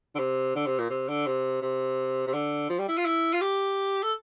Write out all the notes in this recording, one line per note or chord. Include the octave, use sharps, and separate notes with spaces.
D3
C3
D3
C3
A#2
C3
D3
C3
C3
C3
D3
F3
G3
E4
F4
E4
F4
G4
A4